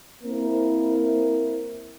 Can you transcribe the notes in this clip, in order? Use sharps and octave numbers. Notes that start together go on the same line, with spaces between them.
A#3 C4 E4 A#4